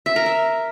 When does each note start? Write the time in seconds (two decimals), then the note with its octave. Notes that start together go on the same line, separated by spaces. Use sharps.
0.06 E5
0.16 A#4
0.26 E5